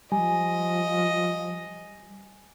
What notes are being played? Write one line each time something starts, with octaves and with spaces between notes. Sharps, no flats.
F3 G3 D#5 G#5